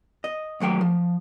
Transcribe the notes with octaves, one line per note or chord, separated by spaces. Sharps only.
D#5
D#2 F#3 A3 G5
F3